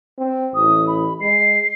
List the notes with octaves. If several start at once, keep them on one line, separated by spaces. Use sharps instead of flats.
C4
A1 D#6
B5
G#3 C7